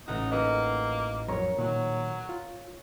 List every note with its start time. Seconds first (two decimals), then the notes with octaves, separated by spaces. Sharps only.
0.08 A1 D#4 F#4
0.32 A#3 D#4 F#4 B4 D#5
1.28 F2 F#3 A#4 C#5 A#5 C#6
1.59 A#2 D#3 F#3
2.29 F4